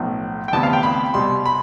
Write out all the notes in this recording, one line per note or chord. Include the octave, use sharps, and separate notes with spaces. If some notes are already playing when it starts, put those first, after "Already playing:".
Already playing: B1 A2 F3
G5
D2 C3 E3 B3 A5
F5
G5
B5
C2 B2 G3 C6
B5